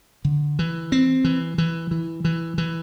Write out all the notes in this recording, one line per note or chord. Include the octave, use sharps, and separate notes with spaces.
D3
E3
C4
E3
E3
E3
E3
E3